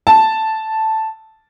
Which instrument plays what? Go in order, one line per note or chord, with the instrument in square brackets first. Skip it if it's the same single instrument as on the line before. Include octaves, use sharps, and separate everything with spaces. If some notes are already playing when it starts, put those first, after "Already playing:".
[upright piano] A5